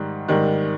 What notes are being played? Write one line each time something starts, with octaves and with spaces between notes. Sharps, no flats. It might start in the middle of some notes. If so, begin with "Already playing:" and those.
Already playing: G#2 D#3 G3
G#2 D#3 G3